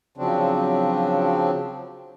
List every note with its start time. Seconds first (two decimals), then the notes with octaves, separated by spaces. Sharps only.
0.17 C#3 F3 F#3 C4 D4